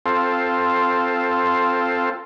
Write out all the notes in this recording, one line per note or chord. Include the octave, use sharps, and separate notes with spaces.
C4 F4 A4